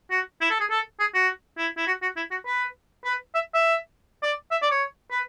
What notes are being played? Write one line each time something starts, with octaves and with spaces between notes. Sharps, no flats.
F#4
E4
A4
G#4
A4
G#4
F#4
E4
E4
F#4
F#4
E4
F#4
B4
B4
E5
E5
D5
E5
D5
C#5
B4